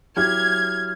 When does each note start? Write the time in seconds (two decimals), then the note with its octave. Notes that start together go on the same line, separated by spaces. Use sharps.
0.16 F#3 E4 G4 F6 G#6